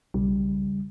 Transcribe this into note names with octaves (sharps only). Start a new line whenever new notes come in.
B1 E2 C#3 G3